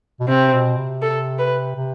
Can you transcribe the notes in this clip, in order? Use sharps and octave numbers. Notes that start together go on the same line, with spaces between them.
B2
C3 C4
B2
C3
A4
B4
C3